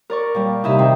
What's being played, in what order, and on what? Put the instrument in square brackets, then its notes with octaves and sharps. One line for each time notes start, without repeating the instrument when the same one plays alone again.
[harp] A#4 D5 C#6
A#2 G3
[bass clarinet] C3 [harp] D#4 E4 E5
[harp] D#3 C4